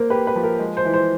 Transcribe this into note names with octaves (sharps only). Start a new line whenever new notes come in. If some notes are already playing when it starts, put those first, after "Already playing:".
Already playing: A#3 A#4 C5
G4 B4
B4
F3
A#4
G#3
C5
E3
C5